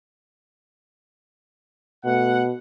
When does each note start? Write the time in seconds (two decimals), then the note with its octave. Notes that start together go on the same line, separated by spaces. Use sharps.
2.05 B2 A3 F#5